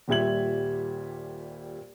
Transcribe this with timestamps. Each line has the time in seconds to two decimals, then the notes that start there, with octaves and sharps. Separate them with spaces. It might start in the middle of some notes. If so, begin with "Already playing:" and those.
0.08 D#1 A#2 G3 E5 G#6 F#7